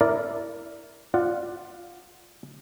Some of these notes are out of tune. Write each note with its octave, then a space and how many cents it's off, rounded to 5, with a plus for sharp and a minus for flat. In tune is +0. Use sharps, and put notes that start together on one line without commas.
E4 +5 A#4 +0 D5 -10
F4 +0 D5 +15 F#5 +0